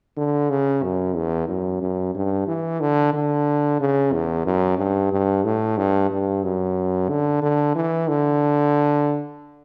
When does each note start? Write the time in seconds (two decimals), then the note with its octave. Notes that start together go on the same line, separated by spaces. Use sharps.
0.17 D3
0.50 C#3
0.83 F#2
1.16 E2
1.49 F#2
1.82 F#2
2.15 G2
2.47 E3
2.80 D3
3.13 D3
3.80 C#3
4.13 E2
4.46 F#2
4.78 G2
5.12 G2
5.44 A2
5.78 G2
6.11 G2
6.43 F#2
7.09 D3
7.42 D3
7.75 E3
8.08 D3